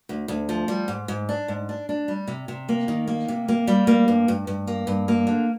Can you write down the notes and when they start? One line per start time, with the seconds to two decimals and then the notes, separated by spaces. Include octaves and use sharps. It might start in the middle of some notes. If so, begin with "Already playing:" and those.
0.09 D2
0.28 D2
0.49 F3
0.68 G3
0.88 G#2
1.08 G#2
1.29 D4
1.48 G#2
1.69 D4
1.89 D4
2.08 G3
2.28 C3
2.48 C3
2.69 A#3
2.88 D#3
3.08 A#3
3.28 C3
3.48 A#3
3.67 G3
3.87 A#3
4.08 G2
4.28 G2
4.47 G2
4.67 A#3
4.87 G2
5.08 A#3
5.27 D3